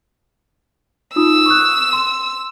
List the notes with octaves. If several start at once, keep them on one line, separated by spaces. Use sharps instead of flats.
D#4 F4 D#6 E6
C#6 D#6 F#6
C6